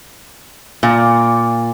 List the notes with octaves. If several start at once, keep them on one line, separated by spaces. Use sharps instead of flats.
A#2